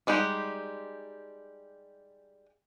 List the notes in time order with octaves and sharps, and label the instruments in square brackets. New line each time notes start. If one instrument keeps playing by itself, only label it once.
[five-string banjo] G3 G#3 D#4 G4 F#5